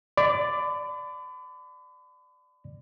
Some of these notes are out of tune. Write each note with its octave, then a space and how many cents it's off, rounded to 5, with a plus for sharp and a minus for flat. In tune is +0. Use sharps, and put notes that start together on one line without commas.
D5 +0 B5 +40